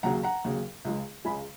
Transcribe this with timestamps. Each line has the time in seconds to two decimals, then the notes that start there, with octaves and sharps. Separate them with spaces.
0.03 D#2 C#3 F#3 F#5 A#5
0.23 F#5 A#5
0.44 D#2 C#3 F#3
0.85 C#2 C#3 G#3
1.25 C#2 C#3 G#3 G#5 B5